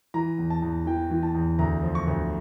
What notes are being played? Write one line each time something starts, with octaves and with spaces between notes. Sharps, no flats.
E3 A#5
E2
A5
E2
E3 G5
E3
A5
E2
D2 A#5
F3
C#6
D2